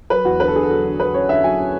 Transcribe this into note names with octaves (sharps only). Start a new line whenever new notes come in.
F#3 B4
E2 F#4
D3 B4
A4
D3 G#4
A4
F#3
D3
D3 B4
C#4 C#5
D3 E5
F#3 G#5
C#4